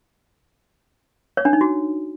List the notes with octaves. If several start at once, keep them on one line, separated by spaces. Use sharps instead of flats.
C#5
D4
D#4
F#4